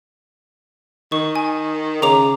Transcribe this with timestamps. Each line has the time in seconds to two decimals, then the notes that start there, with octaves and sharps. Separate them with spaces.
1.12 D#3 C#6
1.36 G#5
2.02 C#3 A#5 D6 F7